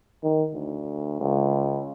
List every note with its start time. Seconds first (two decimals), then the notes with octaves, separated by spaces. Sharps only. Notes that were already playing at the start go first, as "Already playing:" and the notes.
0.23 D#3
0.54 D2
1.21 C#2